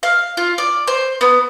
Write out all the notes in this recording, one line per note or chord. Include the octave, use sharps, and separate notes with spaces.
F5
F4
D5
C5
B3